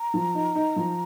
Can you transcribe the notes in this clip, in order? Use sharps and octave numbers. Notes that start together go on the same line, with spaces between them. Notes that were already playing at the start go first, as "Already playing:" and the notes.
Already playing: A#5
F3
D#4
D#4
F3